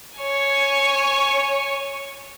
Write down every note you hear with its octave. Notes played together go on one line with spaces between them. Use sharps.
C#5 G#5